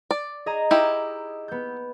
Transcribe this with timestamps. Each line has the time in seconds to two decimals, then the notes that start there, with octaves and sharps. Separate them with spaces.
0.11 D5
0.46 G#4 D#5 A#5
0.71 D#4 E4 G4
1.48 B3 G6